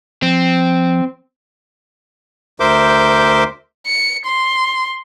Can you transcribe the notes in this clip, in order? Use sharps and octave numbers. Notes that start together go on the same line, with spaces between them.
F3 C4
D2 A#4 C5 E5 D6 G6
C#7
C6